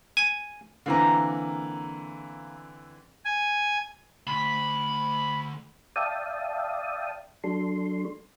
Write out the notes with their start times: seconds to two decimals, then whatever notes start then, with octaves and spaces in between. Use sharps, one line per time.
0.17 G#5
0.86 D3 E3 A#3 C4 A#5
3.25 G#5
4.27 D2 B5
5.96 D5 E5 F5 G5 A5 D#6
7.44 F#3 D4 A4 C6